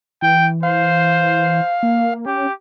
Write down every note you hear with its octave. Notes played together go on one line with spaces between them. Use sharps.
E3 G5
C5 F5
A#3
C#4 G4